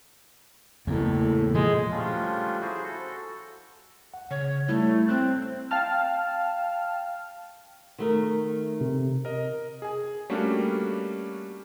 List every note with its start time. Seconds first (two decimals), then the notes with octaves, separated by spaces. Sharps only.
0.87 E2 A2 C#3 A#3
1.54 A#2 F3 G#3
1.91 F3 G3 A3 C#4 D4 F4
2.61 E4 F#4 G#4 C5
2.84 F#4 A4
4.14 F#5
4.31 C#3 C#5
4.69 G3 A3 E4
5.09 C4 F#6
5.71 F5 G5 A5 F6
7.98 D#3 A3 A#4
8.81 C3
9.25 A#4 D#5
9.82 G#4 G#5
10.30 G3 A3 A#3 C#4 D4 F#4